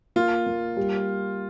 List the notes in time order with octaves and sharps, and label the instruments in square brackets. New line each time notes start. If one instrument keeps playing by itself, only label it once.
[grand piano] A#3 [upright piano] F4
[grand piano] A#3
G3